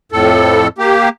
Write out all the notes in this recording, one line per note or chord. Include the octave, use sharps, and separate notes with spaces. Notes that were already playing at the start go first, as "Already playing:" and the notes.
F2 A2 A4
A#3 G4